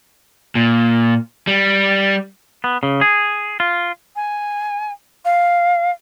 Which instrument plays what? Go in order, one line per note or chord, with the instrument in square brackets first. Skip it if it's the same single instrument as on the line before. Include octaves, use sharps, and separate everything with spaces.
[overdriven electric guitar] A#2
G3
[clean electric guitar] B3
C#3
G#4
F4
[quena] G#5
F5